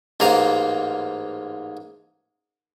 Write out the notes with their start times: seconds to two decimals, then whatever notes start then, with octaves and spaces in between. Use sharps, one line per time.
0.20 A1 G#2 A#3 F5 A#5